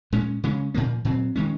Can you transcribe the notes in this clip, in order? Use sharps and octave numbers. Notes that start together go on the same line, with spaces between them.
A#2 G#3 C#4
C#3 G#3 C#4
A#2 F3 A#3
A#2 F#3 C4
D#3 G#3 C#4